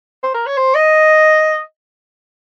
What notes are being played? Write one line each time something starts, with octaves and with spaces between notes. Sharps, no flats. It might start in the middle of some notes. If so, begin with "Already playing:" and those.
C5
A#4
C#5
C5
D#5